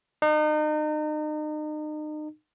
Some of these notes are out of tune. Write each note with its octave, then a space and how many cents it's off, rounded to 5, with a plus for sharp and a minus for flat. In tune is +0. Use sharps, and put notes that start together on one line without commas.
D#4 -35